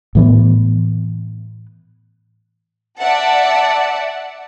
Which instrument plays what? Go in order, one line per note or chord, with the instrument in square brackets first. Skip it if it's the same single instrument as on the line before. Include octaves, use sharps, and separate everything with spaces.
[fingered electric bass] A2 E3 B3
[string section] D5 E5 F#5 A5